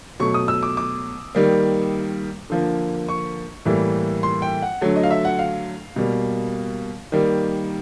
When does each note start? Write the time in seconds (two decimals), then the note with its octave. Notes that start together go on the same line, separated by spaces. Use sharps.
0.20 B2 F#3 A3 C#6
0.34 D#6
0.48 E6
0.63 D6
0.77 D6
1.35 D#3 G3 A#3
2.50 D3 F3 A#3
3.09 C#6
3.65 A2 E3 G3 A#3
4.23 C6
4.42 G5
4.62 F#5
4.81 D3 F#3 A3
4.96 D#5
5.03 F5
5.10 E5
5.25 F#5
5.39 F5
5.96 B2 G3 A#3
7.12 D#3 G3 A#3